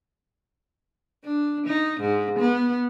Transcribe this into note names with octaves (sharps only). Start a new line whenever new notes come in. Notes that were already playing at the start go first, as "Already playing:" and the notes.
D4
D#4
G#2
B3